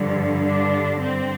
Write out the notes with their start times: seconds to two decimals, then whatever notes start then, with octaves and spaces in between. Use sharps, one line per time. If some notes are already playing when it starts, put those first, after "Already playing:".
Already playing: G2 D3 F3
0.47 D4
1.00 C4